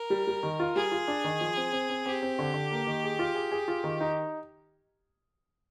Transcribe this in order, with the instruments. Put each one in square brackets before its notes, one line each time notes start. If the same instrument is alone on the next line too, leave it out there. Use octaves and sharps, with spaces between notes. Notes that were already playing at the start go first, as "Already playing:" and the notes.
Already playing: [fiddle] A#4
[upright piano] G3
G3
D#3
F4
[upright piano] G3 [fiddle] G#4
[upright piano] F4
D4
D#3
F3
C4
C4
C4
[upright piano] C4 [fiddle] G4
[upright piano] C4
D3
D3
A#3
D#3
G#4
F4
G#4
G#4
F4
D#3
D#4